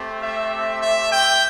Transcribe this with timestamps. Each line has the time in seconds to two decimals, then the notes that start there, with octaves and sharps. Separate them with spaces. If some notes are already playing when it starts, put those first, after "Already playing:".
Already playing: A3 C4 G4
0.20 E5
0.81 E5
1.11 G5